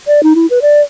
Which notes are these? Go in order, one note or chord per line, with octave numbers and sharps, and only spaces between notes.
D5
D#4
E4
B4
D5